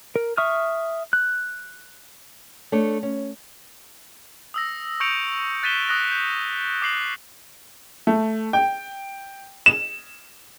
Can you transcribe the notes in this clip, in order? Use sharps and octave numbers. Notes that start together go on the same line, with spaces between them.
A#4
E5 C#6 D#6 F6
F#6
A3 D4 C#5
C#4
D#6 E6 A#6
C#6 E6 G6 C#7 D7 F7
F#6 A6 B6 D#7 E7 G7
D#6 F#6 A#6
G6
D6 F#6 C7 F#7
A3
G5
E7